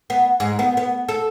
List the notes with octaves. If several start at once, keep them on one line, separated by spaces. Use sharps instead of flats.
B3
G#2
B3
B3
A4